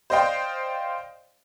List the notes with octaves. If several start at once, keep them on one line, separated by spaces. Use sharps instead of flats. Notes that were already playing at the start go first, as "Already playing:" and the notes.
C5 D5 D#5 F5 G5 C6